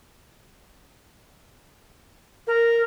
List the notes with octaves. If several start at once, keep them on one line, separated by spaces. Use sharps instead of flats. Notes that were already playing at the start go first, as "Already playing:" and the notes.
A#4